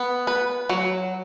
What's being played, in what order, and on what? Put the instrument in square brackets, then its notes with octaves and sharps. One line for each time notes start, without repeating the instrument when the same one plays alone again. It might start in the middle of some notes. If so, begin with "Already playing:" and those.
Already playing: [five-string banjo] B3
B4
F#3